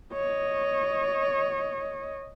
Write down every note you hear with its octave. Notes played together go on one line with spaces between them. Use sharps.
C#5 D#5